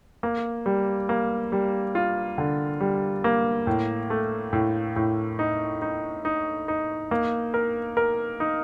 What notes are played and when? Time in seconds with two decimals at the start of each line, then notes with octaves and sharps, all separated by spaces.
0.23 A#3
0.66 G3
1.09 A#3
1.52 G3
1.95 F4
2.38 D3
2.81 G3
3.24 A#3
3.67 A2
4.10 A3
4.53 A2
4.96 A2
5.39 D#4
5.82 D#4
6.25 D#4
6.68 D#4
7.11 A#3
7.54 A#4
7.97 A#4
8.40 D#4